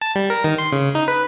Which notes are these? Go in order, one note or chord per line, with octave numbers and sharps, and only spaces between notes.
A5
G3
A#4
D#3
C6
C#3
D#4
B4